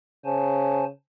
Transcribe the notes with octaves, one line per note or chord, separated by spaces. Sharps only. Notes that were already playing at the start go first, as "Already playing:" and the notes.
C#3 C5 G#5 A5